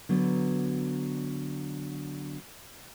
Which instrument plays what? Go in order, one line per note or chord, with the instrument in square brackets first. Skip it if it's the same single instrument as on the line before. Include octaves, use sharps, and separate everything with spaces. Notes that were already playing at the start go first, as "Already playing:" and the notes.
[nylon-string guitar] D3 F#3 B3